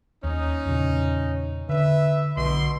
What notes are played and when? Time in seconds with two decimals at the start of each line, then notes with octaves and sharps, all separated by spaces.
0.24 D#2 C#4 D#4
0.65 E2 A#2 C#3
1.69 D3 B4 E5
2.37 B1 B2 D3 C6